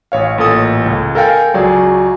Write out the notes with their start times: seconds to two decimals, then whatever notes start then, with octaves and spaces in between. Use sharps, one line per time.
0.12 A1 C#5 F5
0.38 A1 A#2 A4 D#6
0.86 C#2
1.15 A4 A#4 F5 G5 G#5
1.54 C#2 F#3 G#4 D5 G#5